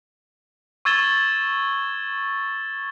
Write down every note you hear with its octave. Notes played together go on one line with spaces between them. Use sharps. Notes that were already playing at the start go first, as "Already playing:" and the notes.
C#6 E6 G#6 A6 E7 G7